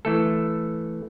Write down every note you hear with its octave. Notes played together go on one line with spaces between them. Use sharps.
E3 A3 A4